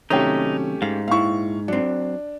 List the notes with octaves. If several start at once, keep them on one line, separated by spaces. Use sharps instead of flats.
F#2 C3 D#3 A3 C#4 D#4 G4
G#2 F5
A#2 E4 F5 C#6
F#3 C4 D4